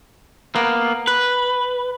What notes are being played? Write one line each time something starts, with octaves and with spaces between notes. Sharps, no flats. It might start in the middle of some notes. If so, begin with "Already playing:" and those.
A#3 B3
B4